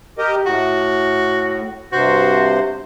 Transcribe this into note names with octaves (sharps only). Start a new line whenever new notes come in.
G4 A#4 D#5
A2 F#4
G2 C3 F#4 C5